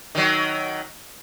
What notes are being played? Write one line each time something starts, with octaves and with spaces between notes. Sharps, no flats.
D#3 F#3